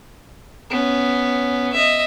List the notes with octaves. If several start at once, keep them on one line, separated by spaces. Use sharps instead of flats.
B3 C#4
D#5 E5